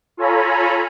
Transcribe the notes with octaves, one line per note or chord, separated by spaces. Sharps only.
F4 A4 C#5 G#5 A#5 B5